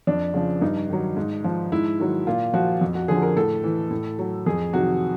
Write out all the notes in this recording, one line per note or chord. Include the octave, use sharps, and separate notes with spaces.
F2 D4
C#3 F3
G2 D#4
D#3 F#3
G#2
F3
G#2 E4
D#3 F#3
A#2 F4
F3 F#4
F2
F#4
D3 F3 G#4
A#4
A2 A4
E3
A2
F#3
F2 G#4
C3 D#3 F#3 F#4